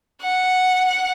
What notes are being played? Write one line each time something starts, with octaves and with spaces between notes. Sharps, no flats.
F#5